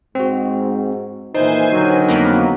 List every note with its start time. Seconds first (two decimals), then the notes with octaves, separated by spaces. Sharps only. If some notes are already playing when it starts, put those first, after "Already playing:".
0.15 G#2 C4 F#4
1.35 A#2 D#3 E3 D#4 C5 G#5
1.71 D3 D#3 F#3
2.08 F2 A#3 B3